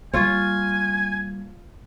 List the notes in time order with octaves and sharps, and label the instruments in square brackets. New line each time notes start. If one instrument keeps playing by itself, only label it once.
[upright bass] G3 A#3 [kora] F4 C#5 [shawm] G#5